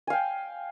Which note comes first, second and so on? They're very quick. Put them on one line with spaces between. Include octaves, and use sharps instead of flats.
G#5 F5 G5